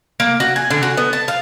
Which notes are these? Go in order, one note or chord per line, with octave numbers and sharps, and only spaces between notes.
A#3
F#4
G#5
D3
F#4
B3
A5
F5